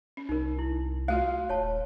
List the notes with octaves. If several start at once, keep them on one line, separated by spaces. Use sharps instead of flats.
C#4
C2 D#4 A#4
E4
A3 F4 F#4 F5
D#1 C#5 A5